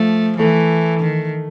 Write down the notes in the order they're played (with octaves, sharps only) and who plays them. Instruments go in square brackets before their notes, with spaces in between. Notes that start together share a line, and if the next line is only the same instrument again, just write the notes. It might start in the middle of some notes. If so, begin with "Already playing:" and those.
Already playing: [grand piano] F3 [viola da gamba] A3
[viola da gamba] E3 [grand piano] A3
[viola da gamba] D#3